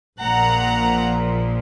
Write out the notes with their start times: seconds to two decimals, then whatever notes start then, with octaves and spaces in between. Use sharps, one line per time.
0.21 A#1 A#2 F3 F#5 A#5